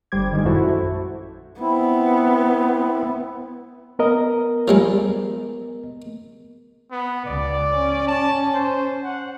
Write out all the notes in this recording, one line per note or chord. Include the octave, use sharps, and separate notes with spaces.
G1 G3 C5 D6 G#6
D#3 G#3
A#1 F#2 E4 F#4 A4 C5
B3 C4 E4
B3 A#4 D#5
F3 G3 G#3
B3
C#2 D5
C#4
A5
C5
F#5